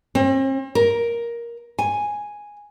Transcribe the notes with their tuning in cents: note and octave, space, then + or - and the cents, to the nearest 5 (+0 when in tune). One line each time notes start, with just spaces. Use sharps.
C4 +45
A#4 +10
G#5 +0